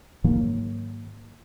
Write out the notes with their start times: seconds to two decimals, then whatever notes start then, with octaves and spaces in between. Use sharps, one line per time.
0.24 G#2 D#3 F#3 A#3